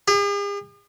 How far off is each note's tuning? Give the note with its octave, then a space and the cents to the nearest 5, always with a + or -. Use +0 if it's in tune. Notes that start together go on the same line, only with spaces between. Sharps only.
G#4 -45